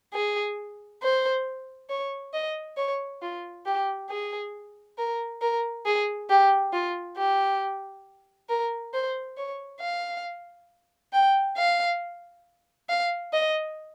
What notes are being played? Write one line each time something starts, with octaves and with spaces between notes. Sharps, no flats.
G#4
C5
C#5
D#5
C#5
F4
G4
G#4
A#4
A#4
G#4
G4
F4
G4
A#4
C5
C#5
F5
G5
F5
F5
D#5